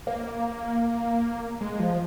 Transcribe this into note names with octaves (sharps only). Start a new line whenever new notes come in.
A#3
G#3
F3